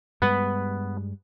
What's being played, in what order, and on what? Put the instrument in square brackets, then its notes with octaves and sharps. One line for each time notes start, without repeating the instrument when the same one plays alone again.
[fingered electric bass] G2 G3 G#3 [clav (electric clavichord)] B3 B4